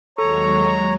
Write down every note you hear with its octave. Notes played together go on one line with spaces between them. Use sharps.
D#2 F#3 G#3 A4 C#5 A#5 C#6